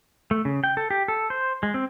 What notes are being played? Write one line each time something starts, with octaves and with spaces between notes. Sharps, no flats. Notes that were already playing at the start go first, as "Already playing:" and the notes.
A3
C#3
G5
A4
G4
A4
C5
G#3
C4